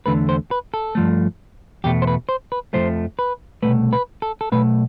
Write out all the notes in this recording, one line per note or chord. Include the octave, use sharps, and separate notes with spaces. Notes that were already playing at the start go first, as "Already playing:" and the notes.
E2 D3 A3 B4
C5
B4
A4
G2 F3 A3
E2 B2 A3 G4
C5
B4
C5
B4
F2 C3 F3 A3 C5
B4
C2 B2 A3 B4
B4
A4
A4
B1 B2 A3 B4